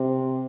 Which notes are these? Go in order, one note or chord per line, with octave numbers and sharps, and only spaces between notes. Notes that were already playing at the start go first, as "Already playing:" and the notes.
Already playing: C3